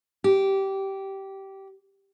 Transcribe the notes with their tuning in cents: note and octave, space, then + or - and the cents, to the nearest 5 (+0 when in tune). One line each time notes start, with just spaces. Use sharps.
G4 -15